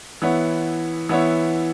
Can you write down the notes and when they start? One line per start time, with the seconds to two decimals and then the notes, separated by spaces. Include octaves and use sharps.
0.22 E3 B3 E4 C#5
1.09 E3 B3 E4 C#5